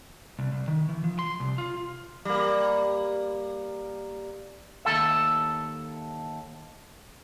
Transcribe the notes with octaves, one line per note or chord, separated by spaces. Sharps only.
C2
C2
D#3
E3
F3
C6
C2
F4
G3 A#3
D#2 A4 E5